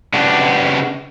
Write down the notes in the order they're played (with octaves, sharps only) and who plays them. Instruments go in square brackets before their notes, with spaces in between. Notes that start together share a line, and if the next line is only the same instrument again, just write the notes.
[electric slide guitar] C#3 B3 D4 F#4 G4